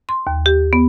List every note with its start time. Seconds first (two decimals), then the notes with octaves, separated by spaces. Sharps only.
0.09 C6
0.27 D#2
0.46 G4
0.73 B3